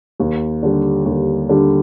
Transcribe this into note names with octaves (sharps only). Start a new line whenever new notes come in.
D#2
D3 G3
D#2
D3 G3